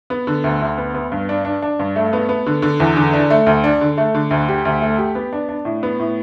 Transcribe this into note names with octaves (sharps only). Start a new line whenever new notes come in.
B3
D3
D2
D2
B3
B3
G2
D4
D4
D4
G2
A3
B3
B3
D3
D3
E2
D3
D4
A3
D2
D4
D3
A3
D3
D2
G4
D2
A3
G4
B3
D4
D4
A2
B3
A2